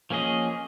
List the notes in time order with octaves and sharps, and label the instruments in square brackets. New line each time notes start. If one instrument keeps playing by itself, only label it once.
[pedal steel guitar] F3 A#3 C#4 G#4 D#5